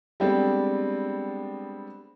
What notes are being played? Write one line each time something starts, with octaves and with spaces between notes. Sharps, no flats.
G3 G#3 B3 C4 D4 A4